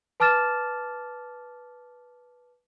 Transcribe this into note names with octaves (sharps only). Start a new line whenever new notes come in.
B4 A5 D6 F6 A6 E7